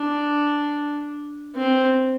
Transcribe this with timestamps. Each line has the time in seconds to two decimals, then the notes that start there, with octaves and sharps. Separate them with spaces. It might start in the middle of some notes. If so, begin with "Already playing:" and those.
Already playing: D4
1.56 C4